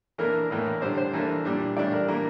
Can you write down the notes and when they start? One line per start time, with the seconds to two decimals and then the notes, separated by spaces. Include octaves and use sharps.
0.18 E3 A#3 D4 A#4
0.50 A2 E3 A#3 D4
0.81 D3 G3 D4 C5
0.97 C5
1.13 E3 A#3 D4 A4
1.45 A#2 G3 D4
1.77 A2 E3 G3 D4 D5
1.92 A#4
2.08 E3 A#3 D4